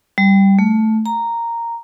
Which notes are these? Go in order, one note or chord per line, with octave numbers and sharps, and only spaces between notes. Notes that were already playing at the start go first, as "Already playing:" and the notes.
G3
A3
A#5